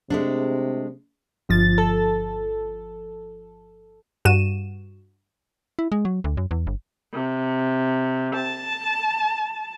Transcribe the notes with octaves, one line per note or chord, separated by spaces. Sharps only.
C3 G#3 A3 D4
G1 F3 A6
A4
G2 F#4 D#7 E7
E4
G#3
F#3
D2
F#2
E2
G1
C3
A5